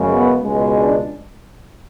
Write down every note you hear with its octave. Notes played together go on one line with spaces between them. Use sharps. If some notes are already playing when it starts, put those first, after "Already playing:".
Already playing: F#2 C#3 G#3
B3
C#2 B2 G#3
D4